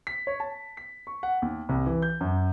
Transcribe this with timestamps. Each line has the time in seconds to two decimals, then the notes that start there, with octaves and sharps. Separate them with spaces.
0.07 B6
0.27 C#5
0.40 A5
0.77 B6
1.07 C#6
1.23 F#5
1.42 D#2
1.69 C2
1.86 E3
2.02 G6
2.21 F#2